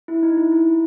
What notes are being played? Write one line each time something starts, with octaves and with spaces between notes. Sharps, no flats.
E4
D#4
E4
E4